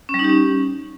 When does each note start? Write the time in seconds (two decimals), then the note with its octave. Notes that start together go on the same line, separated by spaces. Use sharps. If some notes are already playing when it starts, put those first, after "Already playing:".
0.09 C#4
0.14 G3
0.19 D#4
0.24 G4
0.29 C#4